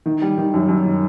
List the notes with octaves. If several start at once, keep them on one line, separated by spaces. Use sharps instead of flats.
D#3
G3
D#3
F#2
F#2
D#3